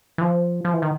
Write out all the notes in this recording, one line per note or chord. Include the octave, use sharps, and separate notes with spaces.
E3
F3
F3
E3
D#3